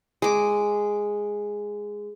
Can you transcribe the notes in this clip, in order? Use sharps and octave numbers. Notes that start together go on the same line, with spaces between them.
G#3 D6